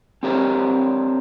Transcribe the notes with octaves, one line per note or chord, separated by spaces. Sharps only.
C4 D4 G4 A#4 C5 C#5